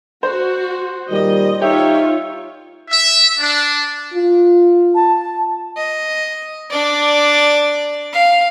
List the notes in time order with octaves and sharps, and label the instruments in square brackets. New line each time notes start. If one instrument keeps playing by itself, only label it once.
[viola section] F#4 [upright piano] C5
[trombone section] A#2 D#3 G3 [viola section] D#5
[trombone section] D#4 [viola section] F4 C#5 [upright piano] G4 [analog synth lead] E5
[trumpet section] E5
D4
[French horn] F4
[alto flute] A5
[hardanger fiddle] D#5
D4 D5
F5